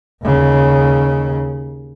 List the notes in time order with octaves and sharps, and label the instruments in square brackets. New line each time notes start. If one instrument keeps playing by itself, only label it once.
[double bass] D#2 C#3